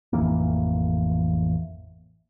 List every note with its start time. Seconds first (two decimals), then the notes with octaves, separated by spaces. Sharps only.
0.13 A1 F2 E3 A#3